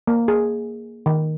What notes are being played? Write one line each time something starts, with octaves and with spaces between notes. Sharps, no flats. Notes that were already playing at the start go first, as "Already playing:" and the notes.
A#3
G#4
D#3